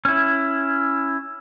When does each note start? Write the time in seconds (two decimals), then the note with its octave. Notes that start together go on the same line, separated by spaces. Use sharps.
0.05 C#4 E4